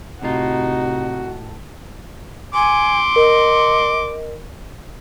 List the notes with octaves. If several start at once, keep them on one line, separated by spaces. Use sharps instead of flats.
A2 C3 D#4 F4 F#4
G#5 C6 D6
A#4 D#5